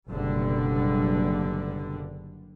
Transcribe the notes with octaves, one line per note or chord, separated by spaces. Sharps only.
F#1 B2 D3 G3